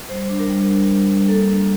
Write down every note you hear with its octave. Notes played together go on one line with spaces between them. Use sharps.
G3 C5
D4
A#4
G3
D4
G3
G3
A#3 A4
D4